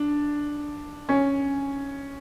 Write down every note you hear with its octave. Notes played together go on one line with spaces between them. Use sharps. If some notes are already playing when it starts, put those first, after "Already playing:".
Already playing: D4
C#4